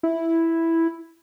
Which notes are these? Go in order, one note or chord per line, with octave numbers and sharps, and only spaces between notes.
E4